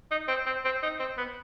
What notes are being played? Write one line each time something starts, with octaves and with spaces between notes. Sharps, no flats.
D#4
C4
C4
C4
D#4
C4
B3